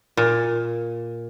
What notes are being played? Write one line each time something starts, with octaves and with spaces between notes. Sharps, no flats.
A#2